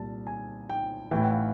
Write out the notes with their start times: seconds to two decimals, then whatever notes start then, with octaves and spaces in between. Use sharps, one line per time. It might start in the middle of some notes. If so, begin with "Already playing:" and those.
Already playing: C2 A#2 A5
0.27 G#5
0.70 G5
1.11 A1 A2 E3 G5
1.22 F#5
1.32 F5